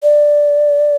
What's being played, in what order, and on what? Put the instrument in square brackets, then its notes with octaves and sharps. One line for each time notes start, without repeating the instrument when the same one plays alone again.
[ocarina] D5